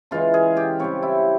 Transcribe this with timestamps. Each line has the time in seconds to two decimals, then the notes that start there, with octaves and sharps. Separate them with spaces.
0.11 C#3 E3 G#3 F4
0.34 G#4
0.57 G4
0.79 C#3 G3 C4 C#5
1.03 E4